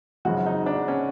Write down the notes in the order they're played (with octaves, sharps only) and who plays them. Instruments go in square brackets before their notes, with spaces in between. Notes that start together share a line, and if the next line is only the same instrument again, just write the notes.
[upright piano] G#1 F#2 C#3 F3 [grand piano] F#4
[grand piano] D#4
D4
C#4